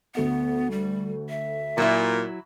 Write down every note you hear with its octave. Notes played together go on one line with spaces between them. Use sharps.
D2 A3 B3 F#5
G3
E5
A#2 F#3 E4